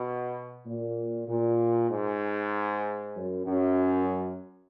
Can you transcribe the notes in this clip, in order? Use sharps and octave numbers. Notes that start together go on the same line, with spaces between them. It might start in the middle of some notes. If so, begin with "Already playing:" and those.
Already playing: B2
A#2
A#2
G#2
F#2
F#2